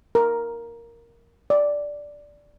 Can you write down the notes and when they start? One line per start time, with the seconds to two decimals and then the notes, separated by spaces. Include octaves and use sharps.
0.15 A#4
1.50 D5